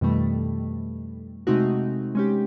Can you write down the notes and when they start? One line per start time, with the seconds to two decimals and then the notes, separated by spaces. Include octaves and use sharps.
0.01 F2 B2 D#3 G3 A3
1.47 C3 G#3 A3 C4 D#4 F#4
2.15 G#3 C#4 G4